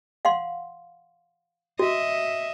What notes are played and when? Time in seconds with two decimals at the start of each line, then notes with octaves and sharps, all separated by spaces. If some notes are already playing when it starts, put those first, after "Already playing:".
0.25 F5 F#5 C6
1.79 F#4 D#5 E5